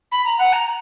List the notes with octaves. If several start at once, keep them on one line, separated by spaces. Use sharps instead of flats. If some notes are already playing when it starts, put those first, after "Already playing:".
B5
A#5
F#5
A#5